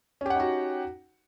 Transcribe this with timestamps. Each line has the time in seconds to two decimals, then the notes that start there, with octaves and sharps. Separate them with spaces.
0.21 C#4
0.26 G4
0.30 F#5
0.35 D#4
0.40 F#4